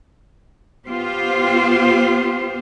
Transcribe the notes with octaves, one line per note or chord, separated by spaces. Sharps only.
B3 F4 G4 C5